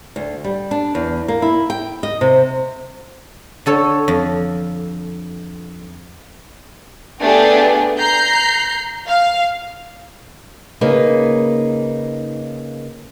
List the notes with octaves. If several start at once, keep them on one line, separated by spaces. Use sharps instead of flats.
D2
G3
D4
E2
A#3
E4
G5
D#5
C3
D3 A4 C#5 A5
F2
A3 B3 D4 G4 G#4
A#5 G6 C7
F5
C#3 A#3 D#4 G#4 B4